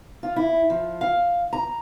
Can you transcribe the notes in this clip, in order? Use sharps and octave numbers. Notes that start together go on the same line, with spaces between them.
F4
E4
F3
F5
A#5